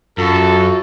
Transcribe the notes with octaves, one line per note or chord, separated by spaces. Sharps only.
F#2 F4 F#4 A4